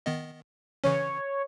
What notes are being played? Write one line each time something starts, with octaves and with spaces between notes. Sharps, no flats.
D#3 B3 D#5
C#3 E3 C#4 C#5